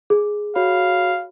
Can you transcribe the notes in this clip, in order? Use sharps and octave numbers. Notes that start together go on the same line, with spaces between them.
G#4
F#4 C#5 F5 B5